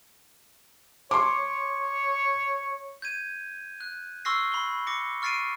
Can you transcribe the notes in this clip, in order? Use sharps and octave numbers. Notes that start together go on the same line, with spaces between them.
C#5 C6 D6
G6 G#6 D#7
F#6
C6 C#6 E6 F6 A#6 C7
B5 G7
D6 A#6 C#7
C#6 F6 A6 C7 D7 D#7